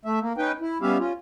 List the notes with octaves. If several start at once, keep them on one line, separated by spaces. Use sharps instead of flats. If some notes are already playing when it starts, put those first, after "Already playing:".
A3 E5
A#3
C#4 D#4 B4 G5
E4
G3 B3 C#4 G4 E5 F5
C#4 F4